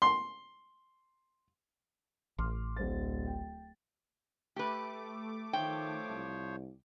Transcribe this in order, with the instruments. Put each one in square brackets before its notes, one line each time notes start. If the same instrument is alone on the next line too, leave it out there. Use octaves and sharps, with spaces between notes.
[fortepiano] C6
[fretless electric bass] A1 [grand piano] C6 D6 F6
[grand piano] D1 C5 A6
G5
[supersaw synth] A3 D6 [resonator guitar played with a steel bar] G4 B4
[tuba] D#3 [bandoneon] F3 C5 C#5 [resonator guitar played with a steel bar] G5
[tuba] C2